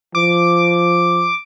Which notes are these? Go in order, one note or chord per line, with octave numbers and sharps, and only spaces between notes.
F3 D6